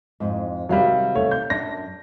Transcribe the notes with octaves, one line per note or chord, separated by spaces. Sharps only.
F2 G#2
C3 D#3 F#3 G3 F5
A3 C#5
G6
F#2 D4 A#6